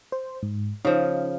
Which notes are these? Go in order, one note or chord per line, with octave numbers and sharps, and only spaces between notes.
C5
G#2
C#3 F3 D#4